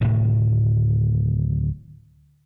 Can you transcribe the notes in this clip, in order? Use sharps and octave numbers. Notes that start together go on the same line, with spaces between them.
D1 A2 C3 D#3